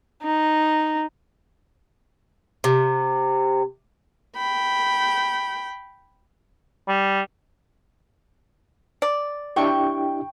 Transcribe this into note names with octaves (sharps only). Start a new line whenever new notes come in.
D#4
C3
G5 B5
G3
D5
D4 E4 G4 G5 C#6